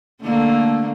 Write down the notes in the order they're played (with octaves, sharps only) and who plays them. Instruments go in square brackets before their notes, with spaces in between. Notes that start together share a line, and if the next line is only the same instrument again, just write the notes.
[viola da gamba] D3 A3 A#3